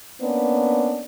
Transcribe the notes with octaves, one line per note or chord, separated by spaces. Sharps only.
A#3 B3 C#4 D4